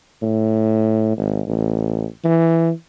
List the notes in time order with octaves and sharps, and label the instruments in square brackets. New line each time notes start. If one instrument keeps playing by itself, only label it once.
[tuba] A2
G#1
A1
E3